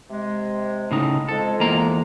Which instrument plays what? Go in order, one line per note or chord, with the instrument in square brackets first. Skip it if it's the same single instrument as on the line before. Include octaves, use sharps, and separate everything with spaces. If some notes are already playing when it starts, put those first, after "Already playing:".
[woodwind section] C3 G#3
[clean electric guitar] A2 C#3 D#4
[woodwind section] F2 G#3 [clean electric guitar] A4
[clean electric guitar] E2 A#3 A#5